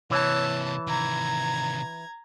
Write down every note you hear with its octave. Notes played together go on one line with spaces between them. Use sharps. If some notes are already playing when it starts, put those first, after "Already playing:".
C3 E3 A#3 C#5 A5
C3 D#3 A#5 G#6